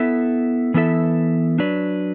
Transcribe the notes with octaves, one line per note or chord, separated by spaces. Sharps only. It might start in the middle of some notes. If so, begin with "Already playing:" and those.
Already playing: B3 E4 A4 E5
E3 B3 E4 A4 E5
F#3 D4 B4 D5